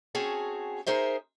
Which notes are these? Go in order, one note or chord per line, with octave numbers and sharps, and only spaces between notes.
C4 C#4 F#4 G#4 A5
D#4 G#4 A#4 C5 E5